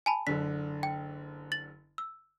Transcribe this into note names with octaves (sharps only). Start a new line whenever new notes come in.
G#5 A5 B5
F#1 D3 B6
G5
A6 F#7
E6